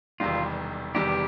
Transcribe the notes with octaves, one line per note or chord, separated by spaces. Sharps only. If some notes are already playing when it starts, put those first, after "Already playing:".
E1 E2 C3 D#3 G3 F4
E1 E2 C3 D#3 G3 G4